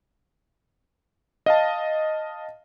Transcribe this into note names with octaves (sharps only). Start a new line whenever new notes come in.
D#5 F5 A5